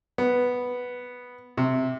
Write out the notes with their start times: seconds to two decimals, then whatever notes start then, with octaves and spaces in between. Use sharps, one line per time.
0.18 B3
1.57 C3